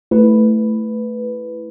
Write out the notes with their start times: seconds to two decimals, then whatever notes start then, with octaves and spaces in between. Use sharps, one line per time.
0.11 A3 E4 B4